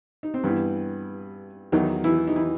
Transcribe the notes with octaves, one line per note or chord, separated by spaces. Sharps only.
D#4
C4
G2 E3 B3
E2 D#3 F#3 D#4
E3 E4
D#4
E3 E4